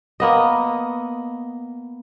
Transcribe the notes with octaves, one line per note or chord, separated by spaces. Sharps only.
A#3 B3 D#5